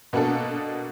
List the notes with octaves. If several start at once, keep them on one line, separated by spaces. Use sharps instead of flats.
B2 A#3 B3 D4 F#4 A4